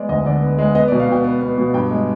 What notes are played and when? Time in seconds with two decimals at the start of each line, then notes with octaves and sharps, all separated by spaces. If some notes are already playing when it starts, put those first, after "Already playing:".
Already playing: G#3 B3 D5
0.09 D2 D#5
0.25 D3 D5
0.42 B3
0.58 G#3
0.75 B3 D#5
0.88 D5
0.92 B2
1.00 F5
1.09 B2 G5
1.24 B3
1.42 B3
1.58 B2
1.74 G2 G5
1.91 G#3